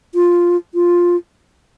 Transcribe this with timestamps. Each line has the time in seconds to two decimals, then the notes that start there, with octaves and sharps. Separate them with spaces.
0.15 F4
0.75 F4